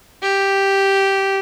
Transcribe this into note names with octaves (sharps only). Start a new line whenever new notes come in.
G4